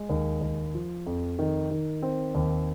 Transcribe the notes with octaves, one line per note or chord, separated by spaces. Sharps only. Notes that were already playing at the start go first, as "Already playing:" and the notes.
Already playing: G#3
D#2
D#2
F3
F2
D#3
D#3
C4
D#2